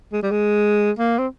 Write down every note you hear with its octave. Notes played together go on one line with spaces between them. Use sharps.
G#3
G3
G#3
A#3
C4